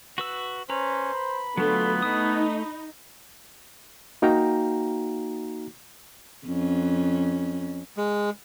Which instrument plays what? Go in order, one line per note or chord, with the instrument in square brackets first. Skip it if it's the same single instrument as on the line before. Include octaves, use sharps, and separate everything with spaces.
[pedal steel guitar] F#4 B4 E6
[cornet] C#4 [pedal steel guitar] B4 A#5 [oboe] C5
[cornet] B5
[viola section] D3 [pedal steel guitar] F#3 A3 F4 [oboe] B3
[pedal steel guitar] A3 D#6 [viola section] D#4
[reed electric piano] A#3 D#4 F#4 F5 G5 A#5
[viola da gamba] F2 C#4
[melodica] G#3